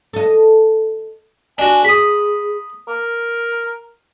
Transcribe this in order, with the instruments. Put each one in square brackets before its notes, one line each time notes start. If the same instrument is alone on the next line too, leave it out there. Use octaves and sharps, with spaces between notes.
[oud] A4 D#5
[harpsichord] D4 F#4 [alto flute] G#5
[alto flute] G#4 [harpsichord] B5 D#6
[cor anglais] A#4